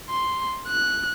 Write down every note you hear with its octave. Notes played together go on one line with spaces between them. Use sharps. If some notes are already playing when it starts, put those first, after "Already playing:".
C6
F#6